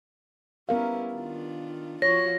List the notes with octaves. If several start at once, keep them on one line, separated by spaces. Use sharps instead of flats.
G3 B3 C#4 E4 A#4 F5
D#3 D4 F4
F3 F4 F#4 C#5 A#6